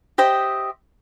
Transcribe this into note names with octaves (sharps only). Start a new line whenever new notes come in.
G4 C5 D#5 E5